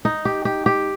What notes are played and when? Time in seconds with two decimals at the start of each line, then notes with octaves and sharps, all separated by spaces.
0.05 D#4
0.25 G4
0.45 G4
0.66 G4